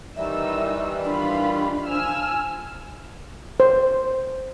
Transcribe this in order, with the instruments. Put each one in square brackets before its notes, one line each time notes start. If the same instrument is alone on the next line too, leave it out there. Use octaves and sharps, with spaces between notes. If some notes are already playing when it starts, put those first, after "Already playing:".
[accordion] D#3 E3 G3 [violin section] D#4 E6 [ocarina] E5
[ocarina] D4 [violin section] F4 B5
[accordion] F3 [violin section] G#5 E6 F6
[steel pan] C5